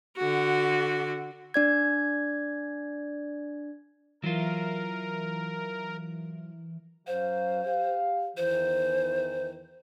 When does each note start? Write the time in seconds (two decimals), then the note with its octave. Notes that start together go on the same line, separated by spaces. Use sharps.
0.18 D3 F#4
1.54 D4 D5 G#6
4.24 E3 F#3 F4 A#4
7.07 F#2 F#3 C5 F5
7.65 G4 F5
8.37 E2 D#3 E3 C5